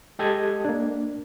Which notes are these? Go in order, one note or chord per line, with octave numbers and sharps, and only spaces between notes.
G#3 G4 A4 D#5 G#6
A#3 D4